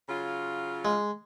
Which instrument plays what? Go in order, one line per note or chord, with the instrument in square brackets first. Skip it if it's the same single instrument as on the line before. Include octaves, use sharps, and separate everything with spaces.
[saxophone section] C#3 F#3 F4
[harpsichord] G#3